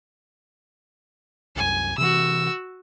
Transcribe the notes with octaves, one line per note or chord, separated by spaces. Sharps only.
C2 F#2 G#5
C3 E3 F#4 E6